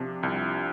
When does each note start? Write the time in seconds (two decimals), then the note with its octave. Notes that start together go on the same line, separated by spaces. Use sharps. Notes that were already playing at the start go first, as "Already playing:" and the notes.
Already playing: C3 F3 D4
0.23 C2